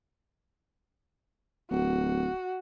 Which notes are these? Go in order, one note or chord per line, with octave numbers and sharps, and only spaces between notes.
D1 F#4